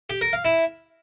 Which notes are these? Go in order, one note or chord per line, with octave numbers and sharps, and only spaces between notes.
G4
A#4
F5
E4